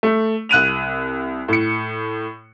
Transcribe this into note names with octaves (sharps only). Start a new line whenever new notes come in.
A3
C2 F#6 D#7 F7
A2 C#7